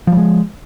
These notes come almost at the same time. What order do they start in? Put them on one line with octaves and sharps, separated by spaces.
F3 G3 G#3